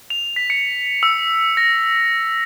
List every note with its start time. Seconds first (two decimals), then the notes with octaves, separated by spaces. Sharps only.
0.10 F7
0.36 B6
0.50 C#7
1.03 E6
1.57 A#6